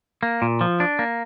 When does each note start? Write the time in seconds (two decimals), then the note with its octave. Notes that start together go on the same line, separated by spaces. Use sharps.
0.23 A#3
0.42 A#2
0.61 F3
0.80 D4
0.99 A#3